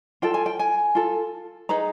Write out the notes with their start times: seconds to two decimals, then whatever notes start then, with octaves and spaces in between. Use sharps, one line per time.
0.22 F4 A4 G5
0.34 G#5
0.46 G5
0.59 G#5
0.95 F4 A4
1.69 D#4 G#4 B4 A#5